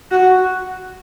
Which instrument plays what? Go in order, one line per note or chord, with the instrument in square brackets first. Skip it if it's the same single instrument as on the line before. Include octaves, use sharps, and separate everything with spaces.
[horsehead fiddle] F#4